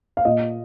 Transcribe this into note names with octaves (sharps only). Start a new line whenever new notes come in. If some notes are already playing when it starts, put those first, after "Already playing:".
F5
A#2 D#5